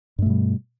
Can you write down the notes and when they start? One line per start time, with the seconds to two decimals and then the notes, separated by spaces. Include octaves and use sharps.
0.19 G2
0.22 A3
0.26 B2
0.30 G3